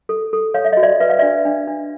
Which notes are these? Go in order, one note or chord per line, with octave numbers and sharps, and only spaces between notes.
A4
A4
C#5 F5
E5
D#5
F#4
D5 E5
B4 E5
F5
D4 D5 E5
D4
D4